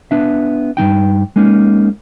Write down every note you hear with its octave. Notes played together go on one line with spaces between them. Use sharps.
B3 D4 E5
G2 D#3 D#4 G5
G#3 A#3 C#4 D#4